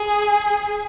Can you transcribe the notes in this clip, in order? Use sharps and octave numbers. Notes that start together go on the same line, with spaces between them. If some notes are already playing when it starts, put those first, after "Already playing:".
Already playing: G#4